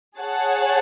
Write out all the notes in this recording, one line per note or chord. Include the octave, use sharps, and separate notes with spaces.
G#4 C#5 F#5 A5